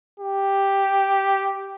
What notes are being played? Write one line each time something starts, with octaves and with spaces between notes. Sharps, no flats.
G4